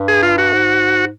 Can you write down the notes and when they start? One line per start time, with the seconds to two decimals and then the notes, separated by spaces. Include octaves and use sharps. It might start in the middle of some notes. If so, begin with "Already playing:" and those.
Already playing: G2
0.08 G#4
0.23 F4
0.38 F#4
0.53 G#2